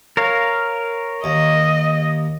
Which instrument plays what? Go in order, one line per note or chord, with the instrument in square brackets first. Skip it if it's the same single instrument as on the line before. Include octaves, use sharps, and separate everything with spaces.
[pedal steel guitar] A#4 C#5 F5
[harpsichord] D#2 [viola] D#5